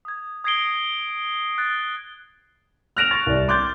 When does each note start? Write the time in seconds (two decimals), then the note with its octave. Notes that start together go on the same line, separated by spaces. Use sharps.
0.05 D#6 G#6
0.44 D#6 G#6 A#6 C7 D7 G7
1.58 F#6 A6
2.97 F6 F#6 A#6 D7 E7 F7
3.11 C#6 A6
3.26 C2 D5
3.48 C6 D6 F#6 G6 A6